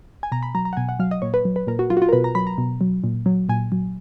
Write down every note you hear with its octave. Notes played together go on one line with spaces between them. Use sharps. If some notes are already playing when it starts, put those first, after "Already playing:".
G#5
B2 A#5
B5
F#3 A#5
A#5
F#5
B2 G#5
F#5
F#3 F5
D#5
A#2 C#5
B4
F#3
B4
A#2 A#4
F#4
F#3 F4
F#4
F4
A#4
B2 B4
A#5
F#3 B5
A#5
B2
F#3
A#2
F#3
A#2 G#5
F#3